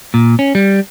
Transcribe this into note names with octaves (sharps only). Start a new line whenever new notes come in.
A#2
C#4
G3